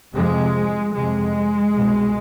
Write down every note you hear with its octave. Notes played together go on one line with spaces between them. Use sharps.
F2 C3 G#3
F2 C3 G#3
C2 B2